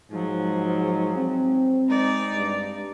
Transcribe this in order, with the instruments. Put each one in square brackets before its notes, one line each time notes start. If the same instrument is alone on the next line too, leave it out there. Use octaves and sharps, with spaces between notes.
[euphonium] G#2 [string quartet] F3 F#3
[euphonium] C4
[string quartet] G#3 D#4 D5
[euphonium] G2